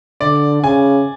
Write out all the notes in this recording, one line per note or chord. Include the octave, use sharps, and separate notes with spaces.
D3 D5
C#3 G#5